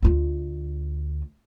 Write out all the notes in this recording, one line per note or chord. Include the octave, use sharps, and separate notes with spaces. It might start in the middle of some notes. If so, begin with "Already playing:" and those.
D2 F4